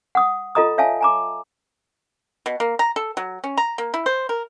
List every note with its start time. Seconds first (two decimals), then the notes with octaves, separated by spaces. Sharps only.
0.15 F#5 D#6
0.55 F4 A4 D#5 A#5 D#6
0.78 C#5 E5 F5 G#5 A5
1.01 G#5 A#5 D6
2.46 B2
2.60 A#3
2.79 A#5
2.96 A4
3.17 F#3
3.44 C#4
3.57 A#5
3.78 A#3
3.94 E4
4.06 C5
4.29 A#4